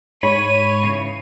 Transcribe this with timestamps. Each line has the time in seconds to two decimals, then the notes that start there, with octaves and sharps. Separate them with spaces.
0.23 G#2 C#5 B5 D#7
0.83 C#3 E3